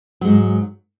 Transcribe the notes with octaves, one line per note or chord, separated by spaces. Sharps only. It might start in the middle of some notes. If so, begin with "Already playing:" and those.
G#2 F#3 G#3